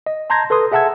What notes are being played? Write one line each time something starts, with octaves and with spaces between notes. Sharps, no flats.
D#5
A5 A#5 C6 G6 G#6 A#6
A4 B4 C6 D#6
G#4 E5 F#5 A5 E6 G#6